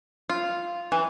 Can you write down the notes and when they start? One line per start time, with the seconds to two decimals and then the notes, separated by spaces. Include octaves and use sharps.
0.30 F4
0.92 E3